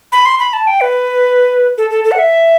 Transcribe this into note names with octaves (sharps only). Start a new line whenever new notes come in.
B5
C6
B5
A5
G5
B4
A4
A4
A4
F#5
E5